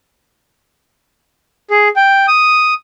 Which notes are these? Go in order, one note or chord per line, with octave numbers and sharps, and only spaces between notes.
G#4
G5
D#6